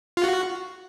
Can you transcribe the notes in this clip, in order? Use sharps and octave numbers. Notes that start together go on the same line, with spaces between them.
F4
F#4